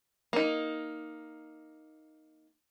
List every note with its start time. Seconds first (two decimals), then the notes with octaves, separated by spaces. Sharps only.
0.33 A#3 D#4